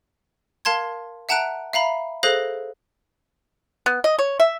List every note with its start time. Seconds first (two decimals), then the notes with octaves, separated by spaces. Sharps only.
0.65 A#4 F5 A5 C6 G#6
1.29 E5 F#5 A5 A#5 F#6 D7
1.73 E5 F5 A#5 B5
2.23 G#4 A4 C5 F5 F#6 A#6
3.86 B3
4.04 D#5
4.19 C#5
4.40 E5